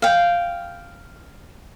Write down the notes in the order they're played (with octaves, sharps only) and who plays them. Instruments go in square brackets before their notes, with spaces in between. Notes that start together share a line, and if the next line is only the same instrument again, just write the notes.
[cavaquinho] F5 G5